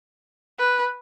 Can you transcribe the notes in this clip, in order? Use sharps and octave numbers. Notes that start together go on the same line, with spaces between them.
B4